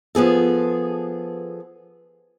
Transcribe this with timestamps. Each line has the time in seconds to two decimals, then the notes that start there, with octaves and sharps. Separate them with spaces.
0.15 F3 B3 G#4 A4